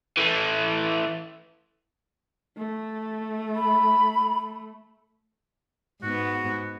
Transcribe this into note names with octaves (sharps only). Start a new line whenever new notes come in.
E3 A3
A3
B5
G#2 B3 F#4